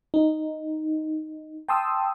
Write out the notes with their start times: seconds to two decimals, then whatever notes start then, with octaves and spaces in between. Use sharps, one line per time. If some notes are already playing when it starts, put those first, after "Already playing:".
0.14 D#4
1.69 G5 A5 C6 D#6 E6